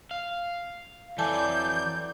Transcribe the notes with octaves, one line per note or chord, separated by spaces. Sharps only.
F5
F2 E3 F#3 A4 D5 G#5 A5 G6